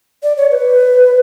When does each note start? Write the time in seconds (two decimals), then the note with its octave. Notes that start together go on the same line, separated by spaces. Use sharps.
0.23 D5
0.37 C#5
0.51 B4